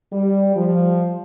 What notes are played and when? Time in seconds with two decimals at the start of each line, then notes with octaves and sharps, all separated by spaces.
0.13 G3
0.56 F3